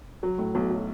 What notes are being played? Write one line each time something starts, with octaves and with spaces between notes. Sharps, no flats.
F#3
A2
B1
F#3